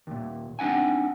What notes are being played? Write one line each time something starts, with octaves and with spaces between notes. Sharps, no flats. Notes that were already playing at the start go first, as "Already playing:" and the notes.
D#2 A#2
C4 D4 D#4 F#5 G#5